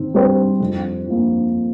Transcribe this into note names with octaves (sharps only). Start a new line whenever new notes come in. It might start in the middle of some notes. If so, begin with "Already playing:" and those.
Already playing: D#3 C4
G3 C4 G4 C5
F2
F3 A#3